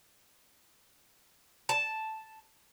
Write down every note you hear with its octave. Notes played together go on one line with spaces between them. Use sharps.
A5